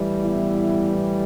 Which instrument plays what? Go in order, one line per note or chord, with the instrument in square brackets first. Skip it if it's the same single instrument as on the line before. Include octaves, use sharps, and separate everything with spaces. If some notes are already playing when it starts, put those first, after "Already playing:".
Already playing: [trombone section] A2 E3 G3
B3 E4